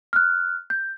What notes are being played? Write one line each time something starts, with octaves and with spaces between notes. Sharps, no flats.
F6 F#6
G6